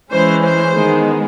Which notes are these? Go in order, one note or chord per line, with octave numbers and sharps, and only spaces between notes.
E3 G#3 C#4 C5
C5
D#3 G#3 B3